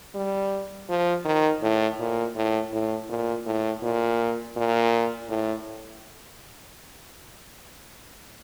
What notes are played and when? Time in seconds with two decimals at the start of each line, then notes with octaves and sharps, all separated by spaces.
0.15 G3
0.89 F3
1.25 D#3
1.62 A2
1.99 A#2
2.35 A2
2.73 A2
3.09 A#2
3.46 A2
3.83 A#2
4.57 A#2
5.29 A2